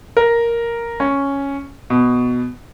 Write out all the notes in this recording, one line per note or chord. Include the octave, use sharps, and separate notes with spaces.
A#4
C#4
B2